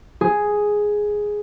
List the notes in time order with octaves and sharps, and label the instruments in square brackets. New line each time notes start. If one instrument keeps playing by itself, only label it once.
[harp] G#4